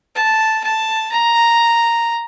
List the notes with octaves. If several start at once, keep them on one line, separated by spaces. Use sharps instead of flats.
A5
A5
A#5